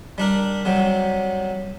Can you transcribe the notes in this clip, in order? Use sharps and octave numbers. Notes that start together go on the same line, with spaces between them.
G3 D4 A#4
C3 F#3 G3